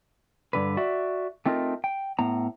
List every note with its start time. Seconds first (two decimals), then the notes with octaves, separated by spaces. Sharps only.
0.53 G2 D3 B4
0.77 F#4 D5 E5
1.46 A3 C4 D#4 F4 G4 A#4
1.84 G5
2.19 A2 B3 A#5